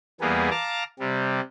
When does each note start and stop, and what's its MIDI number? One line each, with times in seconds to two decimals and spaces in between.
0.21 0.49 40
0.21 0.49 55
0.21 0.49 58
0.21 0.49 59
0.21 0.49 68
0.51 0.84 77
0.51 0.84 81
0.51 0.84 82
0.51 0.84 86
0.99 1.40 48
0.99 1.40 55